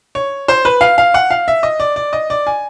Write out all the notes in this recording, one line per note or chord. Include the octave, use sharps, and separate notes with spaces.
C#5
C5
B4
F5
F5
F#5
F5
E5
D#5
D5
D5
D#5
D5
G#5